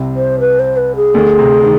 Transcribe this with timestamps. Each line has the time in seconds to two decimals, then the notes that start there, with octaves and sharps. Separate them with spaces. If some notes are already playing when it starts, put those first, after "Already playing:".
Already playing: C2 C3
0.16 C5
0.40 B4
0.59 C5
0.76 B4
0.96 G#4
1.14 D2 D3
1.38 C3 C4
1.63 D#3